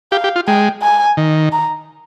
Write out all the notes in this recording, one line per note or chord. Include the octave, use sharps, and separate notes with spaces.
G4 F5
G4
F4
G#3 G5
G#5
D#3
A#5